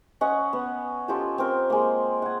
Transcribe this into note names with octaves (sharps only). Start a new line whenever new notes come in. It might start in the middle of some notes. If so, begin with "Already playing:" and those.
C#4 D#5 F#5
B3
C#4 F4 G4 A4
C4 A#4
G#3 A#3
F#5 G#5